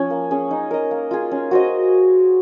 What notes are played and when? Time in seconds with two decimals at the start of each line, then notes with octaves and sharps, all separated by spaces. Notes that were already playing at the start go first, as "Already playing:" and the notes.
Already playing: F3 C#4
0.10 A#3
0.31 C#4 G#4
0.51 D#4
0.71 A#4 D#5
0.91 A#3
1.11 F4 G#4
1.31 C#4
1.51 F#4 C5 D#5